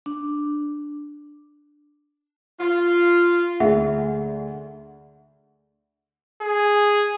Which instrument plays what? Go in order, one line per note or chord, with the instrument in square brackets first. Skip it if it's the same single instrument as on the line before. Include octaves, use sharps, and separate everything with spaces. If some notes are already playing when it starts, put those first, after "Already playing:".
[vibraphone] D4
[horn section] F4
[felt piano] D2 D3 [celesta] G#4 E5 F#5
[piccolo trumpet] G#4